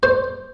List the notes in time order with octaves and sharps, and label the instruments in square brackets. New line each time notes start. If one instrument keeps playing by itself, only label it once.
[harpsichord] C5